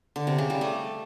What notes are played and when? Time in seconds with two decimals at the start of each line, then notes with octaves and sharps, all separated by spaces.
0.16 D3
0.27 C3
0.38 C#3
0.50 G3
0.61 A3